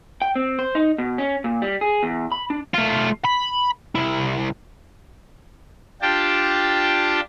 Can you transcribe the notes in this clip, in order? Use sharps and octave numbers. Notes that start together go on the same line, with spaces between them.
G5
C4
C5
D#4
B2
C#4
A#2
G3
G#4
E2
B5
D4
A3 F4
B5
C2 E4
D4 F4 G4 G5 A5